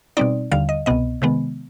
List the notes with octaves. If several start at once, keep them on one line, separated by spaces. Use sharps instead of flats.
B2 G3 C4 D#4 D5
D#2 D3 G3 F5
D#5
C2 B2 B3 D#5
C3 D#3 G#3 B3